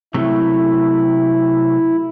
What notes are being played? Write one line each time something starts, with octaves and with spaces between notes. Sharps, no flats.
C3 F#3 A3 E4